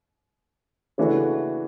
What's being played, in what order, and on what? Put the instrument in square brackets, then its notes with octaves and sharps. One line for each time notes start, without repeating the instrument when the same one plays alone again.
[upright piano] C#3 E3 A3 D4 F#4